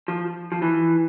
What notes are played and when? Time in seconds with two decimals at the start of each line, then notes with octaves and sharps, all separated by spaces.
0.08 F3
0.52 F3
0.62 E3